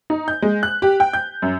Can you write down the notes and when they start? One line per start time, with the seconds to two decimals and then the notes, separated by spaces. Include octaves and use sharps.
0.10 D#4
0.28 G6
0.42 G#3
0.63 F#6
0.82 G4
1.00 G5
1.13 G6
1.42 F#2